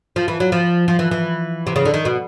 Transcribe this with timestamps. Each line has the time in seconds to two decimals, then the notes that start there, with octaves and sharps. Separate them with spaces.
0.16 F3
0.28 E3
0.40 F#3
0.52 F3
0.88 F3
0.99 E3
1.11 E3
1.67 C3
1.76 C#3
1.85 D3
1.94 D#3
2.05 B2